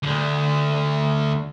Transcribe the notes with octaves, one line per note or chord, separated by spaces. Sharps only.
D2 D3